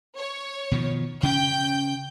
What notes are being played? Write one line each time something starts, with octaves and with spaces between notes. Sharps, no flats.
C#5
B2 D#3 F3
C#3 C#4 G5 G6